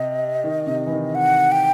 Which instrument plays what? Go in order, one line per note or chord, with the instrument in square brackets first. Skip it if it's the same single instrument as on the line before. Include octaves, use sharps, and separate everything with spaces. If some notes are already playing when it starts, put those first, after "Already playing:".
Already playing: [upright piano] C3 [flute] D#5
[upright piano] D#3
C3
E3
D#3
[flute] F#5
G5